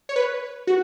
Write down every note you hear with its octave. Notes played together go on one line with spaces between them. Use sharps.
C#5
B4
F#4